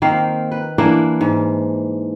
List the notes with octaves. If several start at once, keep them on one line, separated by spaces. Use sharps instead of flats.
D#3 A#3 C4 F5
B4
E3 A#3 D4 E4
G#2